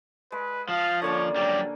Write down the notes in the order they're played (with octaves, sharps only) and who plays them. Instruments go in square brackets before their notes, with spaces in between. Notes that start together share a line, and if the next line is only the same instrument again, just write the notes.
[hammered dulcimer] G#3 [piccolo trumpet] B4
[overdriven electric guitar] F3 [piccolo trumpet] F5
[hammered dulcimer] D3 A#3 C#4 [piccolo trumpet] C#5
[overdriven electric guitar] F#3 G3 [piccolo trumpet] D5